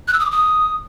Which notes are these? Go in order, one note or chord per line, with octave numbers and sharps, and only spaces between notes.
F#6
E6
D#6
D6
D#6